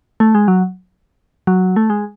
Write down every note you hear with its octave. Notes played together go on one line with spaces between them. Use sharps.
A3
G#3
F#3
F#3
A3
G#3